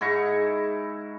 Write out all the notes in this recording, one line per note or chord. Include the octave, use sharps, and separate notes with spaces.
G#2 E4 A#5 C#6